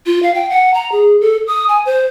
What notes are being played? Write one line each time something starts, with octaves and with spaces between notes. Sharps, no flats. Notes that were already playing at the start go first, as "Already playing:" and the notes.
F4
F5
G5
F#5
A#5
G#4
A4
D#6
G#5
C5